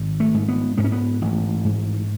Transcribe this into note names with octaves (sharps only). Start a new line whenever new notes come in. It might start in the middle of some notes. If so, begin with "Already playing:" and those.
Already playing: G#1
A3
G#2
B3
G#2 B3
C#4
B3
A1
G#2